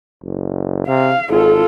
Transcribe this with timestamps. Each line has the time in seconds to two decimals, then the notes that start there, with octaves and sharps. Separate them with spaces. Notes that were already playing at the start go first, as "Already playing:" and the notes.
0.24 F#1
0.88 C3 F5
1.30 G#1 F4 A4